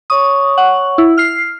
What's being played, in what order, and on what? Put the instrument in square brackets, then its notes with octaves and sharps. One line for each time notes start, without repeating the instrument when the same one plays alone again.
[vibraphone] C#5 C#6 [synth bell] D#6
[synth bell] F#5
E4
F6 C7